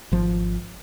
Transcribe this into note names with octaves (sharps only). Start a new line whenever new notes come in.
G#1 F3